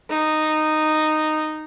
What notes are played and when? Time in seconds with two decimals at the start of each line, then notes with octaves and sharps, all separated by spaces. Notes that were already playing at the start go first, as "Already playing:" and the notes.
0.10 D#4